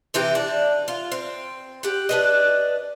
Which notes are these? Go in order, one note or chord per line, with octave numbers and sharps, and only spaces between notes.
C3 E3 G4
D4
F4
C4
G4 F#5
D4 B4 D#5